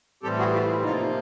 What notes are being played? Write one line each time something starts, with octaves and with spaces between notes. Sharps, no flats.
A2 E3 G3 C4 G4 A4
F#4 G#4
F4 G4
E4
C3 F3 A#3 D#4 F4